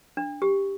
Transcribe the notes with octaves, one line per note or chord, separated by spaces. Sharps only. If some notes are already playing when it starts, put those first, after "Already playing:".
D4
G4